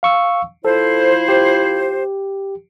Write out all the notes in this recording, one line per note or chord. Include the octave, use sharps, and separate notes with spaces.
F5 C#6 E6
F3 E4 A4 C5
G4